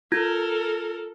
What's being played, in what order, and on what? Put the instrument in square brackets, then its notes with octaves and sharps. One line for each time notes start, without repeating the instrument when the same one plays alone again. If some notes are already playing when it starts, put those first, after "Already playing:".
[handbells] F4 G#6 [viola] A4 A#4